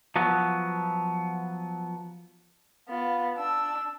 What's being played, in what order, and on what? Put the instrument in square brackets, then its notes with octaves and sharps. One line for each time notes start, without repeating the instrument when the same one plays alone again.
[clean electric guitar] F3 F#3 B3
[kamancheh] B3 F4
D4 E6